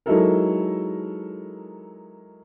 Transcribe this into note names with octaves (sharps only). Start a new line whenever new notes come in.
F#3 G#3 D#4 E4 A4 A#4